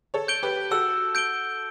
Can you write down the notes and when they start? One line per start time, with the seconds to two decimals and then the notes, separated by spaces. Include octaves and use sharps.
0.14 A4 C#5
0.28 G6 D7 G7
0.43 G4 B4
0.71 F#4 A4 E6
1.15 G6 D7 G7